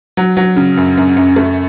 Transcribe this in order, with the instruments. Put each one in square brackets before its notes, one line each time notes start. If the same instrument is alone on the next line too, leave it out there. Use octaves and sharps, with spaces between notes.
[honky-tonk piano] F#3
F#3
C#3
F#2
F#2
F#2
A3